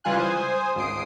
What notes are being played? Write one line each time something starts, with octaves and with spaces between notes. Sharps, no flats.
C#2 E3 G3 F4 G#5 F#6
C5 G#5 D#6
G#1 C#2 D#6 C7 D7